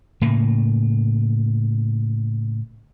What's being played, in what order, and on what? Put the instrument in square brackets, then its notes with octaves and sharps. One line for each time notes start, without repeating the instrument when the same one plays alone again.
[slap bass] A2 C#3 A#3